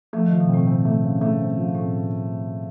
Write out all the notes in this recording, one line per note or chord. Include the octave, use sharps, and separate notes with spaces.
F3 A3
D#3
F3
B2
A2 C4
C4
A3
C#3
A3
C4
F3
A2 C4